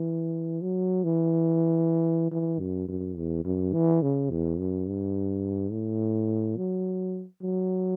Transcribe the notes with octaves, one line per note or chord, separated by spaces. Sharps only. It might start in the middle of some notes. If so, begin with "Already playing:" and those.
Already playing: E3
F#3
E3
E3
F#2
F#2
E2
F#2
E3
C#3
E2
F#2
G2
A2
F#3
F#3